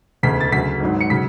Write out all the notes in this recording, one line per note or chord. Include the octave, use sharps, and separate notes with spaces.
E1 D2 C#3 B6
A6
D2 C#3 F#3 B6
G#1 G#2 F#3
C#7
C#3 F#3 B6